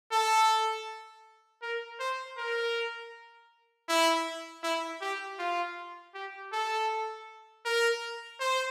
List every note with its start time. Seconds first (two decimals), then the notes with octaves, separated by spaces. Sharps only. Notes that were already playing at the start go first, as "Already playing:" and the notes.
0.12 A4
1.62 A#4
2.00 C5
2.38 A#4
3.89 E4
4.63 E4
5.01 G4
5.39 F4
6.15 G4
6.53 A4
7.65 A#4
8.40 C5